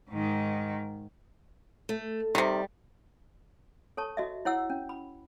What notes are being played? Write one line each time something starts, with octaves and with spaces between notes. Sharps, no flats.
G#2 D#3
A3
C3 D#3 G3
A4 C#5 A5 C#6
F#4 D#5 E5
E4 C#5 F#5 E6
C#4
B5